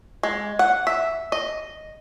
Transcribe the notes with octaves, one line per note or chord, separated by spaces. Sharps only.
G#3
F#5
E5
D#5